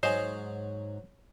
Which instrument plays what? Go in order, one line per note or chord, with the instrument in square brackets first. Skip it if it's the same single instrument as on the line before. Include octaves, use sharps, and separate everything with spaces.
[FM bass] G#2 [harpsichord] F#3 [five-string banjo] G#4 D#5 [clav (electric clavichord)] C5